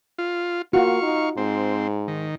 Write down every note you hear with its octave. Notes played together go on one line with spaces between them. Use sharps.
F4
A#3 F4 F#4 F5 C#6
D#4
G#2 C4
D#3